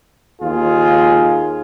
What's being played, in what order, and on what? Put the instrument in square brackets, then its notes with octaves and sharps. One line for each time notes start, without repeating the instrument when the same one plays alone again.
[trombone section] D#2 F4 G#4